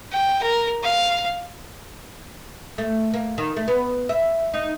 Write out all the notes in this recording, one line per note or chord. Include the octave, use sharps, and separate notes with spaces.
G5
A#4
F5
A3
A#3
D#3
A3
B3
E5
D#4